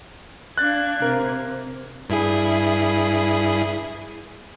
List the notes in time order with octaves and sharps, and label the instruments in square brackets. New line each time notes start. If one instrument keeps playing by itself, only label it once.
[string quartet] D4 F5 G#6 [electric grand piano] F#6 A6
[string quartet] C3 [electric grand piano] A#4
[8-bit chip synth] G2 E4 G#4